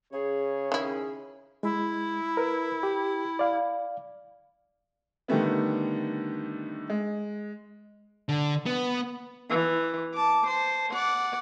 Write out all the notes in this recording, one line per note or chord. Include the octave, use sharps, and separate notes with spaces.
C#3 G#4 C#5
D#3 C#4 E4
G#3 E4
A#4 B4
G4
D5 F5
D3 D#3 G3 A3 B3
G#3
D3
B3
E3
A5 D6
C5 A5
D5 F#5